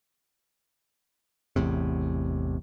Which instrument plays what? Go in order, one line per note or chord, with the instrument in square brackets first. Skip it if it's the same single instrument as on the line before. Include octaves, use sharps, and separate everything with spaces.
[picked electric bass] A1 E2 A2 C3